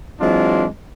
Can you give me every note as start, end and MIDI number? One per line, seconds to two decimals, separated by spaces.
0.20 0.65 52
0.20 0.65 54
0.20 0.65 56
0.20 0.65 60
0.20 0.65 62
0.20 0.65 65